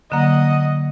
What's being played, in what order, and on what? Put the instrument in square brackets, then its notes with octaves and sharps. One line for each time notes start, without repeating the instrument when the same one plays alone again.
[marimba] D3 F#3 A#3 [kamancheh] D#5 F#5